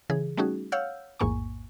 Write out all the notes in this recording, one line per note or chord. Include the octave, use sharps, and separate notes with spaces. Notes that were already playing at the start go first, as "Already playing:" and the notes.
C#3 E3 G#4
G3 A3 C#4 D#4 F#4 G#4
C#5 F5 F#5 E6 F6 G6
A1 E2 G#2 A#3 G#5 C#6